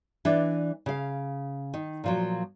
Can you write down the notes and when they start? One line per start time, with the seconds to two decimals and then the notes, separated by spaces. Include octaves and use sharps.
0.25 E3 D4 D5
0.86 C#3 F5
1.74 D#3
2.04 A#2 F3 F#3